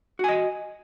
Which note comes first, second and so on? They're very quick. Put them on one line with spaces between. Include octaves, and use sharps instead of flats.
F#4 G#5 D#5